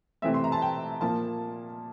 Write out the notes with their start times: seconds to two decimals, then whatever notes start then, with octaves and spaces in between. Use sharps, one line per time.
0.22 C3 E3 A3 C4 E5
0.34 C6
0.44 A#5
0.52 A5
0.62 G5
1.01 A#2 F3 A#3 A5